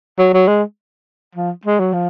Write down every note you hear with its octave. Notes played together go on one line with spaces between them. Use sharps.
F#3
F#3
G#3
F3
G#3
F#3
F3